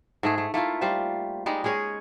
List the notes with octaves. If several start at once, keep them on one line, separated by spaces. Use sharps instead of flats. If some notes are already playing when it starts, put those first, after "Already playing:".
G#2 A3 G#4
A3
A3 A#3 E4 F4
G3 F4 C5
G3 G#3 D#4
G#3 C#4 G#4 C#5